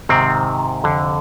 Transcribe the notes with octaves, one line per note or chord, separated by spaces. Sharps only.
G#2 C3 D#3 C4
F2 D3